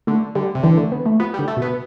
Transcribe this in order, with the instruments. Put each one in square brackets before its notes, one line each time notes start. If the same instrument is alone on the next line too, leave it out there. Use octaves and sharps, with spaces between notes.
[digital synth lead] D3 [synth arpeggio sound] A3
[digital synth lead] D3 [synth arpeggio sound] G3
[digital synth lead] C3
[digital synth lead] D3 [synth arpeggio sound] E3
[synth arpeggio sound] A3
B3
A3
[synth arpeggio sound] F3 [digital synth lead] B3
[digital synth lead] G3
[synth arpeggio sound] D3
[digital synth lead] A3
[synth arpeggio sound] B2
[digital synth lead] B3